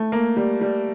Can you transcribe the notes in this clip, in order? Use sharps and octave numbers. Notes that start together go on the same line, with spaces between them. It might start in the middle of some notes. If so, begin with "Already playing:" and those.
Already playing: A3
A#3
G3
G3